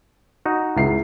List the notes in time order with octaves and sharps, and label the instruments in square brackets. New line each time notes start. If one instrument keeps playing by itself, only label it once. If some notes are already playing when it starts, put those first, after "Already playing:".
[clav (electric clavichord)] D#4 F#4
[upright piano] C#2 E4 C7